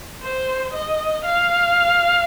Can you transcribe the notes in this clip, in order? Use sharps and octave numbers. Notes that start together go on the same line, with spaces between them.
C5
D#5
F5